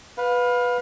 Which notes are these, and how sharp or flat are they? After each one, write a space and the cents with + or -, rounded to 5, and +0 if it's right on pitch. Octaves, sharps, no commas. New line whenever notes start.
B4 +0 F5 +30